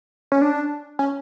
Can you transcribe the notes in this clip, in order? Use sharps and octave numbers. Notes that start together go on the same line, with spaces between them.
C#4
D4
C#4